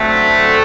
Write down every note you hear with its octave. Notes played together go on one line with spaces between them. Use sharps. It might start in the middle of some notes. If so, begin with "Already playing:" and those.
Already playing: D3 F#3 A3 C4
A4